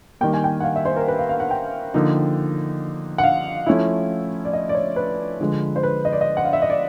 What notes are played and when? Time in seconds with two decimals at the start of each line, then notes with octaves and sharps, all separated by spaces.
0.21 D#3 G3 A#3 G5
0.33 G#5
0.44 G5
0.60 F#5
0.64 F5
0.76 E5
0.85 C5
0.97 A#4
1.08 B4
1.19 F5
1.29 F5
1.40 F#5
1.51 G5
1.94 D3 F3 A#3 D#4
3.18 F#5
3.24 F5
3.66 F3 A3 C#4 E4
4.45 D5
4.53 D#5
4.69 D5
4.75 C#5
4.96 B4
5.40 D3 F3 G#3
5.76 C5
5.83 B4
6.05 D#5
6.13 D5
6.21 D#5
6.37 F#5
6.45 F5
6.53 E5
6.62 D#5
6.70 D5